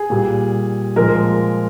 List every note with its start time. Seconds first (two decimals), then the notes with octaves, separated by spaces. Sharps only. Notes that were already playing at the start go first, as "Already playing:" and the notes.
Already playing: G#4
0.10 A#2 G3
0.96 A#2 F3 G#3 A#4